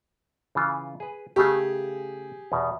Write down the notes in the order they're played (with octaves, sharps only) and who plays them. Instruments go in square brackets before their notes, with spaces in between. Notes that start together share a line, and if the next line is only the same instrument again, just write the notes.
[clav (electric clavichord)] C#3 E3 F4
G#4 B4
[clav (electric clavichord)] C#3 A3 [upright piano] G4 G#4
[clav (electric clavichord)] E2 B2